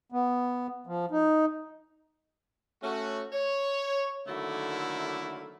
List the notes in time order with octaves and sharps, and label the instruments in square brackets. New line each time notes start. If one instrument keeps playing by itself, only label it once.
[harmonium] B3
F3
D#4
[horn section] A3 C#4 F#4
C#5
D3 D#3 F#3 A3 A#3 E4